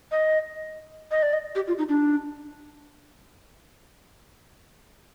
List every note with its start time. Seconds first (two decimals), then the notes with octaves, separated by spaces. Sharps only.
0.12 D#5
1.11 D#5
1.23 D5
1.33 D#5
1.55 G4
1.68 F4
1.78 D#4
1.89 D4